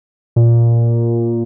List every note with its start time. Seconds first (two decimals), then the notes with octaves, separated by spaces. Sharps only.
0.36 A#2